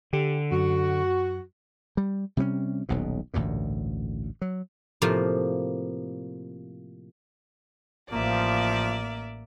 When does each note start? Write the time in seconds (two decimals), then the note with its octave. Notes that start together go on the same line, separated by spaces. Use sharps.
0.13 D3 G4
0.52 F#2 F#4
1.97 G3
2.37 C3 G3 C4 C#4
2.89 D#1 B1 B2
3.34 A1 D2 G2 A#2
4.42 F#3
5.02 A2 C3 F3 A#3
8.10 A1 F3 A#3 D5 E5